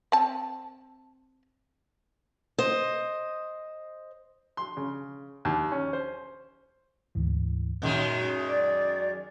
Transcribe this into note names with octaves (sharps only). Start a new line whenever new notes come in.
C4 A5
C5 D#5
C6
C#3
D#2
C#4
C5
D2 G#2 E3
F#2 A#2 D#3 G#3
D5 D6